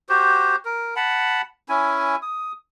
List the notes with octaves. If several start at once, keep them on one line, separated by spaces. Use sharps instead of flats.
F#4 G4 C5
A#4
F#5 A5 B5
C#4 E4 G#5
D#6